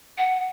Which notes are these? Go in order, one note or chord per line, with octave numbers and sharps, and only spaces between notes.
F#5